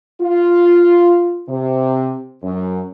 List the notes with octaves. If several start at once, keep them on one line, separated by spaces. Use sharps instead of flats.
F4
C3
F#2